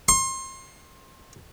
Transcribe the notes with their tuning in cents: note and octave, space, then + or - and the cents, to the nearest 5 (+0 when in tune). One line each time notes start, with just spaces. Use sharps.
C6 +30